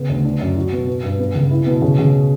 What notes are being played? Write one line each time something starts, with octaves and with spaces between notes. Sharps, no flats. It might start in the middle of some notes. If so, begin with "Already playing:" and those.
Already playing: C#3 B3
D2
D4
F#2
F#4
B2
B3
G2
B3
C#2
E4
B2
C#3
C#3